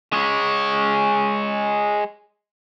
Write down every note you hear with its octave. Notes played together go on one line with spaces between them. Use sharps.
G#3 C#5